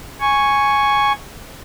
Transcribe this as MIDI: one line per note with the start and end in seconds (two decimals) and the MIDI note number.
0.20 1.12 80
0.20 1.12 85